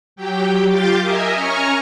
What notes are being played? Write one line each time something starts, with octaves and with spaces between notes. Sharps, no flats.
F#3 G4 G5
F4 G4 F5 D6 G6 A6
A#4 D#5 E5 G#5
C#4 G#5 A#5 C#6 F6